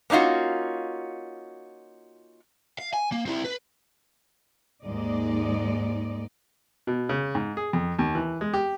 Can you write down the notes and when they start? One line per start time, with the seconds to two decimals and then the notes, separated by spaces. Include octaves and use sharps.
0.10 A#3 C#4 D#4 F4 F#4
2.79 F5
2.94 G#5
3.12 A#3
3.26 C4 E4
3.45 B4
4.83 D#2 G#2 G#3 D#4 D5 D#5
6.87 B2
7.09 C#3
7.35 G#2
7.57 G#4
7.73 F2
7.99 D#2
8.15 E3
8.41 G#3
8.54 G4